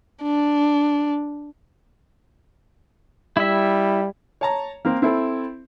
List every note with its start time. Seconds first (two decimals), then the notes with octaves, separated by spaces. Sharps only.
0.23 D4
3.37 G3 E4 E5
4.41 C#5 A5 A#5
4.85 A#3 C4
5.02 C4 E4 A4